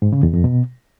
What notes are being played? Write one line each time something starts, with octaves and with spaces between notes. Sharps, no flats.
G#2
C#3
E2
F2
B2